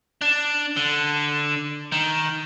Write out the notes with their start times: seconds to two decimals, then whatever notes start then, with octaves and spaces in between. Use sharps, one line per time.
0.21 D4
0.76 D3
1.92 D#3